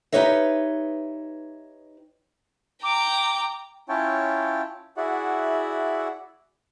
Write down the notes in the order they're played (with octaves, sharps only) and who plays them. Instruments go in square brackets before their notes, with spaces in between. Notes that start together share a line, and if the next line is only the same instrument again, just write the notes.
[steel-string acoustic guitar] D#4 G4 B4 C#5 D#5 E5
[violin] G5 A#5 [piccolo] D6
[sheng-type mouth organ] C#4 E4 F4 C#5 G5 A5
E4 F#4 G#4 D5 E5 F#5